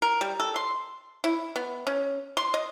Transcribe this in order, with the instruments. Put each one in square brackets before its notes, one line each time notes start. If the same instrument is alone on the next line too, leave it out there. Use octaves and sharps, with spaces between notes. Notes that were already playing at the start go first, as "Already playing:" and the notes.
[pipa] A#4
G3
A4
C6
E4
B3
C#4
C6
D#5